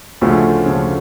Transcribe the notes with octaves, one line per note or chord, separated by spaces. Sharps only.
D2 C#3 F3 A3 C#4
D2 C#3 F3 A3 C#4